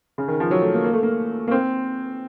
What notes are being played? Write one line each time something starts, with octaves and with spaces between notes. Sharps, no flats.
C#3
D#3
F3
F#3
A3
A#3
A#3
A3
A#3
A#3
C4